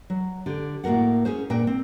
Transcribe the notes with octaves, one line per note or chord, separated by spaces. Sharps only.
F#3
D3 G4
A2 A#3 F#4 A#4 F#5
C#4 G#4 C5
A#2 D4 A#4 G5
C4